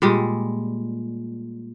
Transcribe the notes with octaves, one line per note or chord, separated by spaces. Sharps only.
A#2 G3 G#3